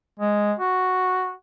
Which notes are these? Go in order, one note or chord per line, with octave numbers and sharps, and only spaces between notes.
G#3
F#4